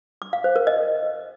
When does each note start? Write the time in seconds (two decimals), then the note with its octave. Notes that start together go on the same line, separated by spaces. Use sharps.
0.22 D6
0.33 F5
0.44 C5
0.56 A#4
0.67 D#5